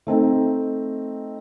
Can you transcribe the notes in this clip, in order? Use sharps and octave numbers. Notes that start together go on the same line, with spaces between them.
A3 C4 D#4 A4